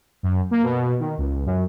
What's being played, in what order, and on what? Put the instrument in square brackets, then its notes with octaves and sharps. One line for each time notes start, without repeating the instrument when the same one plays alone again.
[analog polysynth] F#2
A#3
B2
D#3
C#2
F#2